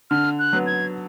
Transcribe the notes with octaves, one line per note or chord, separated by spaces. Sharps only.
D3 F6
F#6
F#3 B3
G#6